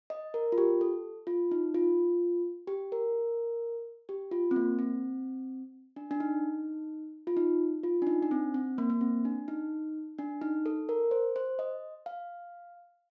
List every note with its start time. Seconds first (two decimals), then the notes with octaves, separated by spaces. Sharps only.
0.10 D#5
0.34 A#4
0.52 F4
0.58 G4
0.81 A4
1.27 F4
1.51 D#4
1.74 F4
2.67 G4
2.92 A#4
4.09 G4
4.32 F4
4.51 C4
4.56 A#3
4.79 C4
5.96 D4
6.11 D4
6.20 D#4
7.27 F4
7.37 D#4
7.83 F4
8.02 D4
8.07 D#4
8.22 D4
8.31 C4
8.54 C4
8.78 A#3
8.90 A#3
9.01 C4
9.25 D4
9.48 D#4
10.18 D4
10.41 D#4
10.66 A4
10.89 A#4
11.11 C5
11.36 C5
11.59 D#5
12.06 F5